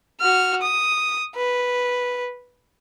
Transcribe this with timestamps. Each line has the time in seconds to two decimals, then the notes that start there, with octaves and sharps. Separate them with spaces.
0.21 F#4 F6
0.62 D#6
1.35 B4